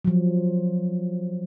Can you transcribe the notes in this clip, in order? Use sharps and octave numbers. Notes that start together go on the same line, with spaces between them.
F3 F#3